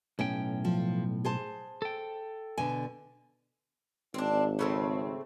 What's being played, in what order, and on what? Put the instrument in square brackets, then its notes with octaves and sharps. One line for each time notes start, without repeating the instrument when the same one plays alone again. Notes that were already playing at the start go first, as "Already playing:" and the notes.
[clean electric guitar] B1 A2 G5 [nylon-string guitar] C#4
[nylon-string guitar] F3
G#4 C5 A5
[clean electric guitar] A4 G5
[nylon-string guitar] B2 D3 G#5
[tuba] G#1 [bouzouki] C4 D4
[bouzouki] C#3 A3 C4